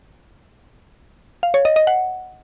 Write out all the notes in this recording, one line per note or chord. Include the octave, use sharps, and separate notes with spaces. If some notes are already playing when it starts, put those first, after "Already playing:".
F5
C#5
D#5
D#5
F#5